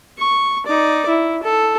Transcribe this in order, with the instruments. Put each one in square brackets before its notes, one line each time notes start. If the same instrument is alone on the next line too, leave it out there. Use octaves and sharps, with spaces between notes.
[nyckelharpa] C#6
D#4 D5
E4
A4